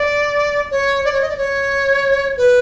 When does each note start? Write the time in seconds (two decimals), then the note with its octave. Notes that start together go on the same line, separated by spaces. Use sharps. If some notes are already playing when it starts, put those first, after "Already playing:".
Already playing: D5
0.71 C#5
1.05 D5
1.13 C#5
1.22 D#5
1.29 D5
1.37 C#5
2.37 B4